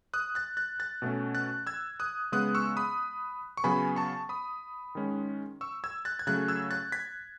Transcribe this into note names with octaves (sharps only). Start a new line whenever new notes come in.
D#6 F#6
F#6 A6
F#6 A6
F#6 A6
B2 A3 C#4
F#6 A6
E6 G#6
D#6 F#6
C#3 G#3 B3 D#6 F#6
C#6 E6
B5 D#6
C#6
C#3 F#3 B3 G#5 B5
A5 C#6
B5 D#6
D#3 G#3 C#4
C#6 E6
E6 G#6
F#6 A6
G#6
C#3 F#3 A3 C#4 F#6 A6
E6 G#6
F#6 A6
G#6 B6